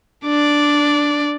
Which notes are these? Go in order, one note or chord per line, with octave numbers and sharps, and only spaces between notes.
D4 D5